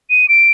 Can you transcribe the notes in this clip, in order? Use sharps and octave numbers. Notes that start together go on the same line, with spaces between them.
D#7
D7